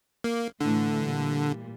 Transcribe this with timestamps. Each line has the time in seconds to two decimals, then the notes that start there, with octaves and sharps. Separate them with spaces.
0.24 A#3
0.60 A2 D3 E3 A3
1.03 A#2 G3